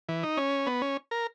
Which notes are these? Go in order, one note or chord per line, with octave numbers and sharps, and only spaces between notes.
E3
D#4
C#4
B3
C#4
A#4